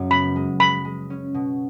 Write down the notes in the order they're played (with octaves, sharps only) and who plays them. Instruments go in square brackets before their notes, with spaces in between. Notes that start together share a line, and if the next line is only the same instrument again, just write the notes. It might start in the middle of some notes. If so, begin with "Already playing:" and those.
Already playing: [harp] F#2 C#3
[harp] B3 [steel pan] B5
[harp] G#3
[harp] G#3 [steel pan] B5
[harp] G#3
C#4
B2